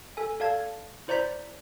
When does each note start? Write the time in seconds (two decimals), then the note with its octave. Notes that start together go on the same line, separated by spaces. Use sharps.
0.17 A4 G#5
0.40 A4 D5 F5 A5 G#6
1.08 E4 C5 D5 A#5 G6 B6